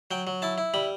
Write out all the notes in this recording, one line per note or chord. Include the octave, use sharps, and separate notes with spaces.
F#3 G5
F#3
E4 A5
E4
G3 B5